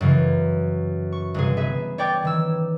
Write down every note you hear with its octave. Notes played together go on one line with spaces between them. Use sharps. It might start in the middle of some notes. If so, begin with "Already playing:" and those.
F#2 C#3 E3
C#6
G1 C3 G#4
B3 G#4 E5
C#5 D5 G5 D6 G6 A6
D#3 E3 E6